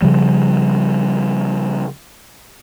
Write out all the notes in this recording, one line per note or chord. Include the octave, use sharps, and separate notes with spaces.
C#3 F3 G3